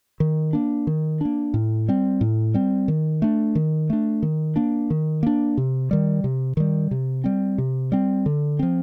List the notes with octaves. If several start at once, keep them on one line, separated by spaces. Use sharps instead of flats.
D#3
A#3 D4
D#3
A#3 D4
A2
G3 C4
A2
G3 C4
D#3
A3 D4
D#3
A3 D4
D#3
A#3 D4
D#3
A#3 D4
C3
D#3 G3
C3
D#3 G3
C3
G3 C4
C3
G3 C4
D3
F3 C4